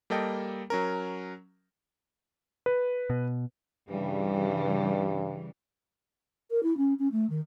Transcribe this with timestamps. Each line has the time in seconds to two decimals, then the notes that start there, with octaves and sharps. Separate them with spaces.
0.10 G3 A#3 A4 D#5 G5
0.70 F#3 C#4 A#4
2.66 B4
3.10 B2
3.90 G2 C#3 E3 G3
6.51 A#4
6.63 E4
6.77 C#4
6.99 C#4
7.12 A3
7.30 D#3